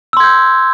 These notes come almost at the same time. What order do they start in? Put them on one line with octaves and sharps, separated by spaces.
E6 C6 G#6 G6